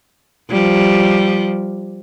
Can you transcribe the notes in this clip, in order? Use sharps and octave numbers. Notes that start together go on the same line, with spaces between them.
F3 G3